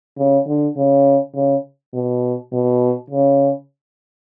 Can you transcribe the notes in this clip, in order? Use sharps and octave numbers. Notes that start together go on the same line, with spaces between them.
C#3
D3
C#3
C#3
B2
B2
C#3